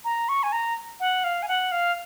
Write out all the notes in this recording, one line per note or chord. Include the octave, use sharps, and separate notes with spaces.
A#5
C#6
G#5
A#5
F#5
F5
G#5
F#5
F5